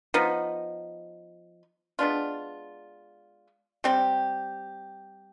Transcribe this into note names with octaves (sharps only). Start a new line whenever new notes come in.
F3 B3 D#4
G#3 B3 D4 F4
G3 C4 G4